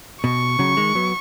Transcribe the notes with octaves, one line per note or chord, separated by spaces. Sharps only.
B2 C#6
C#3 F#3
D#3 G#3
F#3 B3